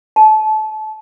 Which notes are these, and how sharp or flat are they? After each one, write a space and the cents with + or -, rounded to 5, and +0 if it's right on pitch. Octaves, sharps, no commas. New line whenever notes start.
A5 -30